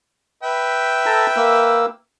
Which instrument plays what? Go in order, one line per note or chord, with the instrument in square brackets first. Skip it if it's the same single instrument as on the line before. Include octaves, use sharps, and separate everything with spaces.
[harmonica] B4 E5 G5
[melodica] A4 A5 A#5
A#3 E6